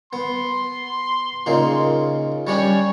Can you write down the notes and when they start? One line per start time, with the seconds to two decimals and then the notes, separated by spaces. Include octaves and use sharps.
0.13 B3 C6
1.46 A#2 C#3 D#4
2.47 G3 C#4 D4 C#5